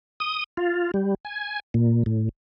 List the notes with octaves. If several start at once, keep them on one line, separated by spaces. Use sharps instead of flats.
D#6
F4
G3
G#5
A#2
A2